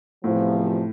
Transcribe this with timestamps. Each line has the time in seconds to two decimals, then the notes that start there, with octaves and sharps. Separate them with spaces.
0.24 E2 A2 C3 F3